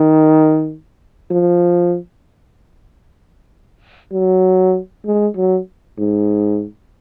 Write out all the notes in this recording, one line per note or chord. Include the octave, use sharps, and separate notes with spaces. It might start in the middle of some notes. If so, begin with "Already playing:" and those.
Already playing: D#3
F3
F#3
G#3
F#3
G#2